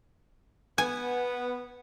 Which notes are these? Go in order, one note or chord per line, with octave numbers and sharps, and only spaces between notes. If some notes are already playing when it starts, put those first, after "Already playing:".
B3 G#5